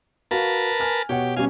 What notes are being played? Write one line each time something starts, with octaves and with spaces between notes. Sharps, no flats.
F#4 A#4 B4 F5 A5
G#5 F6
B2 G4 C#5 F#5
B2 G3 C#4 F5 G#5